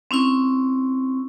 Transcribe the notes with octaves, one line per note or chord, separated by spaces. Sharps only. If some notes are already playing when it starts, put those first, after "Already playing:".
C4 C#4 E4 C#6